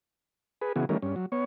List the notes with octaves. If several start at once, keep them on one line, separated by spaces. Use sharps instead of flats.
G#4 B4
C#3 E3 B3 F#4 G#4
D#3 E3 G3 A3 C#4 A#4
G2 C#4
F#3
B3 C#5